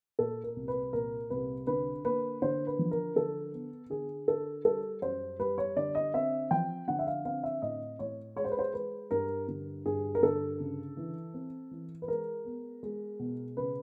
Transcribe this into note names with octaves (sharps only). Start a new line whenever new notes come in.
A#2 A4
A#4
C2
B4
A#2 A#4
C2 B4
D3 B4
A#3 B4
D3 C5
B4
F3
A#4
D3 A4
B3
D3 G#4
D3 A4
G3 A4
F#2 C5
G3 B4
C#5
D3 D5
D#5
C4 E5
F3 G5
D3 F#5
E5
F5
C4 F5
E5
A2 D#5
A2 C#5
G#3 C#5
C5
B4
C5
G#3 B4
G2 A#4
D3
G2 G#4
A#4
D3 A4
C#3
E3
C4
E3
B4
G#3 A#4
B3
G#3
B2
C#3 B4